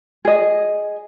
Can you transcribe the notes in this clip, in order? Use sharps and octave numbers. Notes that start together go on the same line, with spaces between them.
G#4 D#5